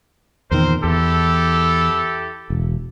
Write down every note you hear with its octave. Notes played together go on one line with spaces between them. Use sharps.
E2 A#2 D#3 C4 A#4 C5
E2 E4 G4 A4
E1